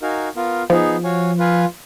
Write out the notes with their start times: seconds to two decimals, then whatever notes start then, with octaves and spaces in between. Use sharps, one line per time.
0.01 D#4 F#4 A#4 F5 G#5
0.35 B3 F4 A#4 F5
0.70 F3 B3 D#4 G#4
1.04 F#4 C#5 F5 G#5
1.39 F4 B4 F5 G#5